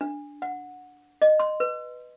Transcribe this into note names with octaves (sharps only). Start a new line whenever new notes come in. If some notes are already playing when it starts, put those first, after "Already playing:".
D4
F#5
D#5
C6
B4